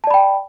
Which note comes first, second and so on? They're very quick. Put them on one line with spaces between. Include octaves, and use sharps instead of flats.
A5 D5 B5 G5